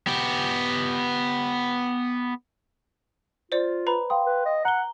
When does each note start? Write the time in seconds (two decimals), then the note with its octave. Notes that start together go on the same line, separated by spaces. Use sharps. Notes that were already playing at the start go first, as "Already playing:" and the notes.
0.07 B3 G4
3.52 F4 C5 D5
3.87 B4 A#5 B5
4.10 F5 G5 C6 D#6
4.26 B4
4.46 D#5
4.65 F#5 A#5 G7